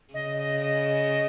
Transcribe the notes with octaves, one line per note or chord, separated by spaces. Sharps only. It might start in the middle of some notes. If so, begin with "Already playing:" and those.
C#3 D#5
D#5
D#5